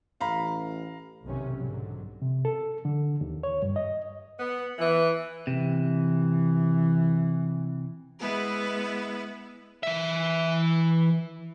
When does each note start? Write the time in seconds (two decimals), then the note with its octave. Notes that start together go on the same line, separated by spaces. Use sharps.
0.21 A1 F5 A#5 B5
1.24 B1 C3 D#3 C#4
1.58 G#2 D3 F#3
2.22 C3
2.45 A4
2.85 D3
3.21 D#2
3.43 C#5
3.62 G2
3.76 D#5
4.39 B3
4.78 E3
5.47 C3 E3
8.20 G#3 B3 E4 B4
9.83 E3 E5